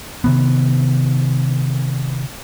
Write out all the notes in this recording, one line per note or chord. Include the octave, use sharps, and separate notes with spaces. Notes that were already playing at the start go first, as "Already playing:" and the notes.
C3 D#3 B3